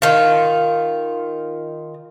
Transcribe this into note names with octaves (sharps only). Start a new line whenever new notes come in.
D#3 F4